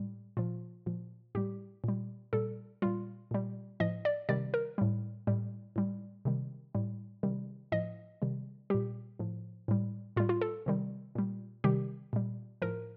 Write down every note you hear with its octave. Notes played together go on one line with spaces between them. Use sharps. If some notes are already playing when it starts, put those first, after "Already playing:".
Already playing: A2 G3
A#2 F3 F4
A#2 F3
A2 G3 G4
A#2 G3
A#2 G3 A4
A#2 G3 F4
A#2 G3
A2 F3 D#5
D5
C3 D#3 G3 D5
A#4
A2 G3
A2 G3
A2 G3
C3 D#3 G3
A2 G3
C3 D#3 G3
A2 F3 D#5
C3 D#3 G3
A#2 G3 G4
A2 F3
A2 G3
A2 G3 F4
F4
A4
C3 D#3 G3
A#2 G3
C3 D#3 G3 G4
A#2 G3
A2 F3 A#4